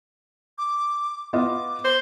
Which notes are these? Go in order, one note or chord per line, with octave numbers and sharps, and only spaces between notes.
D6
B3 F4 D#5 D6
C5